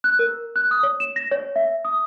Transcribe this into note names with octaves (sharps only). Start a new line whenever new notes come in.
F#6
A#4
F#6
D#6
C#5
E7
A#6
C#5
E5
D#6